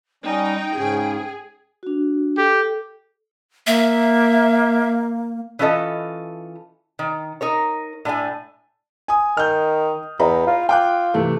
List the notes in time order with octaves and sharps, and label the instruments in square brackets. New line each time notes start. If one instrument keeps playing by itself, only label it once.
[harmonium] G3 C#4 [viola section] D#4 [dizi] G5
[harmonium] G#2 C#3 C#4 [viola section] G#4
[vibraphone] D4 F#4
[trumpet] G4 [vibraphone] A4
[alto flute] A#3 [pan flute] E5
[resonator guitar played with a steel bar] E3 C#4 F4 A4 D#5
D#3
D#4 A#4 C#5
A2 D4 F4 G#5
[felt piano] G#5 D#6
[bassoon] D#3 [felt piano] F6 G6
[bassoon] E2 [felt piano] D#5 A#5 B5
[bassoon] F4
[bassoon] F4 [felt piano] G5 D6 F#6
[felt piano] C3 E3 A3